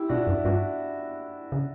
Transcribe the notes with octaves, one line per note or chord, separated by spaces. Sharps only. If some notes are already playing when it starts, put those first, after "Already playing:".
Already playing: E4 G4
B2 D4 F#4
F#2
G2 D4 F#4
C#3